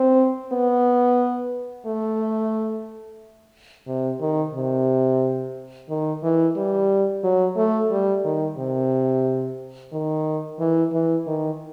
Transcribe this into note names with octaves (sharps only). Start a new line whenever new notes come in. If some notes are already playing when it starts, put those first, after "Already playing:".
Already playing: C4
B3
A3
C3
D#3
C3
D#3
E3
G3
F#3
A3
G3
D#3
C3
D#3
E3
E3
D#3